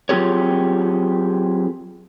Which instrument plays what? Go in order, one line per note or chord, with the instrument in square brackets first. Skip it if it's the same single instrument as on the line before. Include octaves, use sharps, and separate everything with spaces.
[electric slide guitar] F#3 C4 F4 G4 G#4 C#5